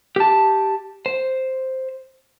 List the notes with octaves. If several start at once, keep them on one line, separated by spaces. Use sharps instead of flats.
G4 A5
C5